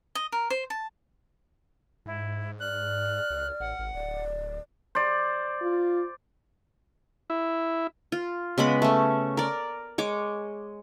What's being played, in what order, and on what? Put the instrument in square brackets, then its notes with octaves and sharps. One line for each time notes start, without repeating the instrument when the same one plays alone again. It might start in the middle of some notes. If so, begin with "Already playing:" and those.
[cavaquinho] D#5
A#4
C5
A5
[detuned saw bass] G#2 [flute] E4
[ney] D5 [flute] F6 [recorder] F#6
[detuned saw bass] C#2
[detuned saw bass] A1 [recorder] F#5
[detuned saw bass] G#1
[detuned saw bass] D1 [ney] D5
[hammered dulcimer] C5 D5
[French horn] F4
[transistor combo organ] E4
[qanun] F4
C#3 G#3 B3 B5
A3 C#4
A#4 D5
G#3 C#5 D6